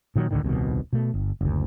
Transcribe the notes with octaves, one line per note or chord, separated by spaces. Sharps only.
A#2 D#3 E3 F#3
C#2 A2 D3 D#3
D#1 C2 B2 D#3
B2 A3
G1
F#1 D2